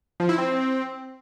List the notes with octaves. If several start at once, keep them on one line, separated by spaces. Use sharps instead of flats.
F3
E4
C4